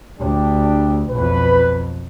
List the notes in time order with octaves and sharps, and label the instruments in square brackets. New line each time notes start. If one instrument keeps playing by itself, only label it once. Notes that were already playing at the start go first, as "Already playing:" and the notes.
[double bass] D2 [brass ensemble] D4 G4
[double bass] B1 F2 [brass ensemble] B4